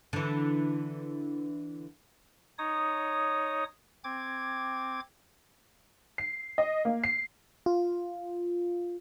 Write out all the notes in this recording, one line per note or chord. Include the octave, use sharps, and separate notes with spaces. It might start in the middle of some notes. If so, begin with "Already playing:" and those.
D3 E3
D#4 C#5 D#6
C4 D6 G#6
C7
D#5
A#3
C7
F4